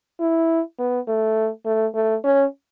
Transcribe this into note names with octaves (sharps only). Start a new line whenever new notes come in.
E4
B3
A3
A3
A3
C#4